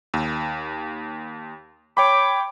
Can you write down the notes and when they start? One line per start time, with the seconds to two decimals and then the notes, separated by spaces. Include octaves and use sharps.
0.14 D#2
1.97 C#5 G5 B5 D6